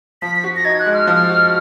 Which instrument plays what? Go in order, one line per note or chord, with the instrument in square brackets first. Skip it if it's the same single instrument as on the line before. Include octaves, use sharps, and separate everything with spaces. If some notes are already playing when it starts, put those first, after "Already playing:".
[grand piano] F3 [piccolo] B6
[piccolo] B6
[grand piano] F#4
[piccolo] A#6
[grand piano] D#4 [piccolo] G#6
[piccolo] F#6
[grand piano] G#3
[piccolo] F6
[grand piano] F3
F#4